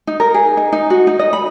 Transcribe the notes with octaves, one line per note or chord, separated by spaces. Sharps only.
D#4
A#4
G#4
D#4
D#4
F#4
D#4
D#5
B5